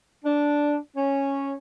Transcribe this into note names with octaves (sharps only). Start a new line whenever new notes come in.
D4
C#4